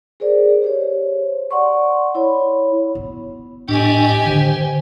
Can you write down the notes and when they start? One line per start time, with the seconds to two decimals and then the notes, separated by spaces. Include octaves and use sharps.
0.20 G#4 A#4 C5 D5
0.62 G4 C5 C#5
1.51 D5 F#5 C6 C#6
2.15 E4 C#5 B5
2.95 B2
3.69 A2 D4 G4 D#5 G#5
4.25 D3 D#3 C5